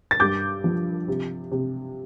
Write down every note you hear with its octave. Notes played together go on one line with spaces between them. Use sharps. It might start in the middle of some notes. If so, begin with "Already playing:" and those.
A6
G2 D6 G6
F3
C3
C3